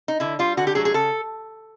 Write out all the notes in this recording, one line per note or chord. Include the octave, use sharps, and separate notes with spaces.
D#4
D3 E4
G3 F4
D3 F#4
G4
F#3 A3 G#4
G#4
C#3 A4